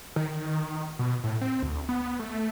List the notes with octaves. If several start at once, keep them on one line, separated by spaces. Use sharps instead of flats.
D#3
D#3
B2
A2
C4
D2
B3
A3